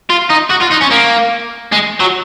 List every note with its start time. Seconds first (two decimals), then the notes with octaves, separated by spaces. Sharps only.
0.10 F4
0.30 D#4
0.50 F#4
0.61 F4
0.71 D#4
0.81 C#4
0.91 A#3
1.72 G#3
2.00 F#3